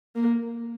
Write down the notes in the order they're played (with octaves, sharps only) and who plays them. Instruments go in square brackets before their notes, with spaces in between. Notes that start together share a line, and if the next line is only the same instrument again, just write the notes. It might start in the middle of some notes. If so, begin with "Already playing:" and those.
[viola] A#3